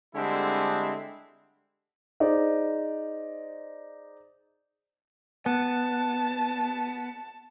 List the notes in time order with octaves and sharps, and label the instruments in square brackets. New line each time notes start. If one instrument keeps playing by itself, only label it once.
[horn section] D3 G3 G#3 C4 E4
[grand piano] D#4 G#4 C5 D5
[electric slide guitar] B3 [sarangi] A5